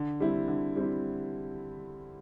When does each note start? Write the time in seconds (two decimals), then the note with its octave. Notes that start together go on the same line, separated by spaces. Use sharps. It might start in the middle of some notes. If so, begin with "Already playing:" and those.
Already playing: D3
0.20 G3 C4 E4
0.48 D3
0.76 G3 C4 E4